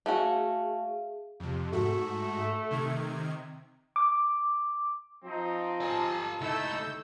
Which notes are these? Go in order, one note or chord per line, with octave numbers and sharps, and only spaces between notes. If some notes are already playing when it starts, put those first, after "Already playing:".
A3 C#4 F#4 G#4 E5 F5
F2 C3
G#2 A3 F#4
C3 D#3 G#6
D6
F3 C4 D#4 A#5
F4 A4 G#5 A5
C#2 A3 D#4 E4 A4 E6 G6